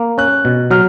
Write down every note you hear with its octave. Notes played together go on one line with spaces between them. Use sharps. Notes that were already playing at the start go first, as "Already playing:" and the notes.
Already playing: A#3
C#4 F#6
B2
F#3 F6